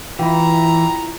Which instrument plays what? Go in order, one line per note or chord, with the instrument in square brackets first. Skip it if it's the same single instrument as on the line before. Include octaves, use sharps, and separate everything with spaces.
[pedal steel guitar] E3 [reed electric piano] E4 F4 [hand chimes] G5 B5 [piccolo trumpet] A#5